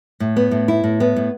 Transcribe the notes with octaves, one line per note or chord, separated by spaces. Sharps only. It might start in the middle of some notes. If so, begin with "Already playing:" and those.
A2
B3
A2
E4
A2
B3
A2